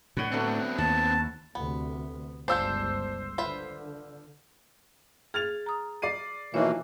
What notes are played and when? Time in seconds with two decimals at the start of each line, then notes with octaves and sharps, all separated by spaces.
0.17 A2 D3 B4 C#5 F#5
0.32 F#3 A3 B3 C4 D4
0.78 D#2 A5
1.55 D2 C3 B3
2.48 G1 C#2 D4 F4 A4 C5 E6 G6
3.38 D3 F4 B4 E5
5.34 G#4 F6 A6 F7
5.66 A#5 D#6
6.02 D5 C7 D#7
6.54 B2 E3 F3 A#3 D#4 E4 C#5 E5